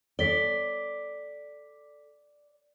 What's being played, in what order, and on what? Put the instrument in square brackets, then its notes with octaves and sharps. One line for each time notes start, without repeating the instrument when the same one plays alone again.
[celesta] A4 B6 G7 [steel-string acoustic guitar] D5